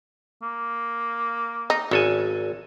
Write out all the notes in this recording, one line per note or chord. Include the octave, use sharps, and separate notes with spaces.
A#3
D#4
G#1 C#3 A4 G#5